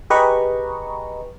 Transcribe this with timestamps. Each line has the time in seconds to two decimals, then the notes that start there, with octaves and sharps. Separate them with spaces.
0.10 G4 G#4 B4 D#5 A#5 C#6